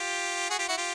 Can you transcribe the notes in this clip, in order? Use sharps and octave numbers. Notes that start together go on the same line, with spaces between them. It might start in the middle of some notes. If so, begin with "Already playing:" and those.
Already playing: F4 G4
F#4 G#4
F4 G4
E4 F#4
F4 G4